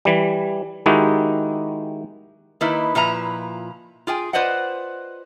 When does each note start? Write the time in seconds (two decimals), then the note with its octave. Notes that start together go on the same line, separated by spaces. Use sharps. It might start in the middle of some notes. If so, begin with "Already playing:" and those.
0.05 E3 G3
0.86 D#3 G#3 D#4 E4 F#4 G4
2.61 D#3 A#3 D#4 E4 B4
2.95 A#2 F3 E4 B4 A#5
4.07 F4 G#4 G5 G#5
4.33 F4 B4 C5 D5 D#5 F#5